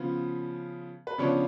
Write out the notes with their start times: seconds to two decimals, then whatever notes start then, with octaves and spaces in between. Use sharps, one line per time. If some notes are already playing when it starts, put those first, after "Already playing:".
Already playing: C#3 F3 B3
1.07 B4
1.18 C#3 F3 B3 D4 C#5